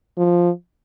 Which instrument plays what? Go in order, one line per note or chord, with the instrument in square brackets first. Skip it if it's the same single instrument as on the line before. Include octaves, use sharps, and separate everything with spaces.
[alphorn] F3